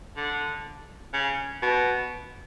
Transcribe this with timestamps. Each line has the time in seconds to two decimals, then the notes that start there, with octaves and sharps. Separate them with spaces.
0.17 D3
1.14 C#3
1.62 B2